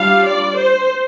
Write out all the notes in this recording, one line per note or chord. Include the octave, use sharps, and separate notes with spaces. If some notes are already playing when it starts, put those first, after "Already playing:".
Already playing: G3 D4 F4 F5
D5
C5